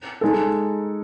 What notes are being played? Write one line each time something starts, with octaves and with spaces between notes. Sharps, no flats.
G#3 D#4 A4